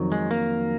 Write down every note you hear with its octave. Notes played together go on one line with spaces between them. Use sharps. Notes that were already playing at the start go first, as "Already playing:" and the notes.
Already playing: F2 D#3 F#3
G#3
A#3